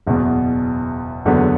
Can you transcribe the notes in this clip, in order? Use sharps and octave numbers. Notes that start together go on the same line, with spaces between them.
F#1 E2 B2
F#1 E2 D3 F#3 B3